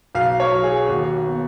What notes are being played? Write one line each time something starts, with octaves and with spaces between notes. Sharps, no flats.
B1 F5
C#5
F#3
G#4
D#2 F#4
B3